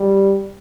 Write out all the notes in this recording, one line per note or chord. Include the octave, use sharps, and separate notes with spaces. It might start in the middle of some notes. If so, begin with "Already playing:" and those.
Already playing: G3